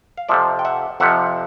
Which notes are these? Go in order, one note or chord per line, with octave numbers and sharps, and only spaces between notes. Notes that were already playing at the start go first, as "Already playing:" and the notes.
F5
F2 C3 F3 D5 E5
G5
E5 F#5
F2 C3 F3 E5 F#5